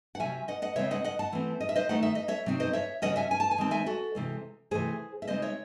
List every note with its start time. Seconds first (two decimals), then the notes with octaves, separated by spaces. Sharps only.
0.15 F#5
0.20 C3 F#3 C#4 E5 G#5
0.48 D#5 F#5
0.62 D#5 F#5
0.76 C#3 G#3 C4 C#5 E5
0.91 D#5 F#5
1.04 D#5 F#5
1.19 F#5 A5
1.32 E3 A3 C4
1.60 D#5
1.69 E5
1.76 C5 D#5
1.89 D#3 A3 D#4 F#5
2.03 E5
2.15 D#5
2.28 C#5 E5
2.46 C3 F#3 C4 D#4
2.60 C5 D#5
2.73 C#5 E5
3.02 C#3 F#3 C#4 D#5 F#5
3.16 E5 G#5
3.31 G#5
3.40 A5
3.51 G#5
3.58 D#3 G#3 C4 A5
3.71 E5 G#5
3.86 F#4 A4
4.15 C3 E3 G#3
4.71 C3 E3 A3 G#4 C5
5.22 E5
5.27 C#3 G#3 C4 D#4 C5 D#5
5.42 C#5 E5